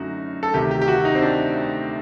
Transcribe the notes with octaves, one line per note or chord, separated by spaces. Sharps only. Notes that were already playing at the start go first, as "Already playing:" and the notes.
Already playing: F#2 D3 F#3 A3 D#4 F#4
A4
D2 C3 D#3 G4
G4
G4
F#4
D#4
C4
D4